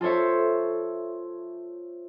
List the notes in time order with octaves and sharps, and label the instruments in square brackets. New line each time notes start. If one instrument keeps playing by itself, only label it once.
[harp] F4 A4 C5 C#5 E5